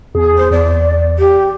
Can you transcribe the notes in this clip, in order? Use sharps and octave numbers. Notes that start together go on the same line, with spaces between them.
E2 G#4
C5
E2 D5
G4